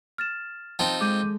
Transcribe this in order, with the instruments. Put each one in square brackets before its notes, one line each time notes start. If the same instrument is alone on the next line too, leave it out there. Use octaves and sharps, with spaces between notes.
[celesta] F6 A6 E7
[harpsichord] C4 D#4 F4 [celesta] G5 A5
[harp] G#3 A4 [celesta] D6 G6 D#7